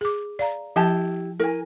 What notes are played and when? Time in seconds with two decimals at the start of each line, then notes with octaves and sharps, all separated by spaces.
0.01 G#4 D6
0.39 D5 F5 A#5
0.76 F3 E4 G4 A5
1.40 E4 A#4 G#5